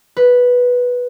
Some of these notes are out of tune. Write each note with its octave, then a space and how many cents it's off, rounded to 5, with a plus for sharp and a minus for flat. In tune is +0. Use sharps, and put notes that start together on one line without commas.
B4 -5